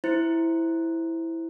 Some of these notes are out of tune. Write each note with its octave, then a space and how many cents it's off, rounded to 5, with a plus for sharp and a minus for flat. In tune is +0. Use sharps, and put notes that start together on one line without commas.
E4 +0 C5 +0